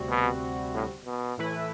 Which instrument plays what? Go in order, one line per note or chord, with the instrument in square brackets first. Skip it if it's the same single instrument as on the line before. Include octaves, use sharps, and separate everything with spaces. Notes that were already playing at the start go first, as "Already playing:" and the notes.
Already playing: [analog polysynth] D2 C3 G3 C4 F#4
[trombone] B2
A2
B2
[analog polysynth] A2 E3 A3 E4 B4